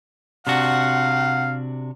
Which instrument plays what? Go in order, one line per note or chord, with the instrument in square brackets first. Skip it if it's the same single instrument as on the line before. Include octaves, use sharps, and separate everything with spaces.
[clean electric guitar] C3 D4 F#4 [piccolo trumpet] F5 [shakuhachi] F#5